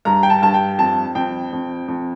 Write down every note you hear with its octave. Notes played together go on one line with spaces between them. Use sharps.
G2 A#5
G5
A5
G2 A5
G5
F2 A5
F2 G5
F2
F2